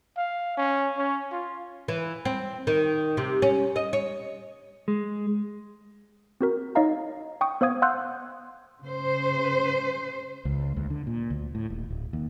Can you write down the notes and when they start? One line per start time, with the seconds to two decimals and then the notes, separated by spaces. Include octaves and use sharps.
0.17 F5
0.57 C#4
0.98 C#4
1.32 F4
1.88 E3
2.25 C4
2.67 D#3
3.17 C3
3.42 C#4
3.76 D#5
3.93 C#5
4.88 G#3
6.41 C4 F#4 A#4
6.75 D#4 C#5 D#5 F5 A#5
7.41 G5 C#6 D#6
7.61 B3 C5 F5 D#6 G#6
7.82 F5 F#5 C6 E6 F#6 G6
8.81 C#3 C5
10.45 C#2
10.76 D2
10.90 D3
11.07 A#2
11.30 D2
11.55 A2
11.70 D#1
11.90 D1
12.13 D#2